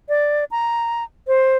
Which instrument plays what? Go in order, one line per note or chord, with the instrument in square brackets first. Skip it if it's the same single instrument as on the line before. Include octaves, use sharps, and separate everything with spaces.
[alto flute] D5
A#5
C5